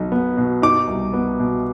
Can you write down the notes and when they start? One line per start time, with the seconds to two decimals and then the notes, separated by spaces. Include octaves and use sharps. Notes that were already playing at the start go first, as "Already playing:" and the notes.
Already playing: B1 D#4
0.12 B3
0.37 B2
0.62 D#4 D6
0.88 C2
1.13 B3
1.40 B2